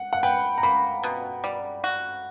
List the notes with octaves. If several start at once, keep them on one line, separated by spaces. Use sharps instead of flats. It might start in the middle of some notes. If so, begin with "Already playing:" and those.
Already playing: F#5
F#5
B4 G5
A#5
A#3 B5
B2
G3
F#4